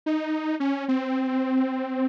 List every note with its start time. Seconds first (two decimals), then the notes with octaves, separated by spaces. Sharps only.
0.06 D#4
0.60 C#4
0.88 C4